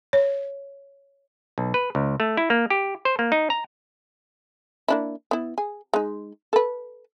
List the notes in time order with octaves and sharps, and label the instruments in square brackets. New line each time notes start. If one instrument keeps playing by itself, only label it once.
[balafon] C#5
[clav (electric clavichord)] B1
B4
C#2
A3
E4
A#3
G4
C5
A#3
D#4
A#5
[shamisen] A#3 D4 E4
B3 E4
G#4
G#3 D#4
A4 B4